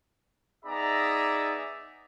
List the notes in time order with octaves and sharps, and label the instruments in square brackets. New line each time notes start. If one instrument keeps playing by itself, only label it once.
[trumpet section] B3 D#4 G#4 D5 E5 A#5